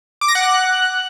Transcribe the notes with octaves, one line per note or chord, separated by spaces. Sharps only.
D6
A#6
F#5
F#6